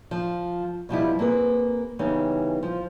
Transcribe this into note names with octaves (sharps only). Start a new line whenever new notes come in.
F3
B2 F3 G3 E4
A#3 C4 G#4 B4
C#3 E3 G3 B3 D#4
F3